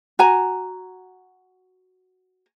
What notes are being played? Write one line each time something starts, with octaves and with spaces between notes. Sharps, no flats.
F#4 G#5 A#5